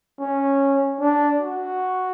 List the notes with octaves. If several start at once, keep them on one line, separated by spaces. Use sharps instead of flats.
C#4
D4
F#4